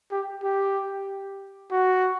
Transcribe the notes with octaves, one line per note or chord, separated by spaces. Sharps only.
G4
G4
F#4